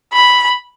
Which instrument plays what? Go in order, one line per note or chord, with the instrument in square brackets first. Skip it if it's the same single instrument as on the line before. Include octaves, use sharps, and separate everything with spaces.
[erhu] B5